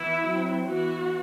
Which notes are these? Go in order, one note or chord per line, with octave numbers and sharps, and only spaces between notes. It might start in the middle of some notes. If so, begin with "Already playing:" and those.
Already playing: E3 B3 E4
F#3 C4
E3 B3 F#4